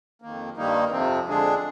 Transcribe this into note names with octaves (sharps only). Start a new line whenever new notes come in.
F2 D#3 A#3
G2 D#3 G3 A#3 D#4
F2 C3 F3 C4
F2 D3 G#3 D4 G#4